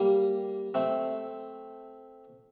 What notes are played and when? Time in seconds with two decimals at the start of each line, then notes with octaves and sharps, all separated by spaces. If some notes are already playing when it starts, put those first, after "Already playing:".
Already playing: G3 A#3
0.74 A3 C4